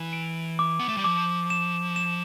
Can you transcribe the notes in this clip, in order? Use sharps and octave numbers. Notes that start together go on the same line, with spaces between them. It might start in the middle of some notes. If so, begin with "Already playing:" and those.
Already playing: E3 G7
D7
D6
B3
A3
G3
F3 D6
E7
E7